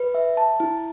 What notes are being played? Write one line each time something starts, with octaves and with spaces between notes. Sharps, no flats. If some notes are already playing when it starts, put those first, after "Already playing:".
Already playing: B4
E5
A5
E4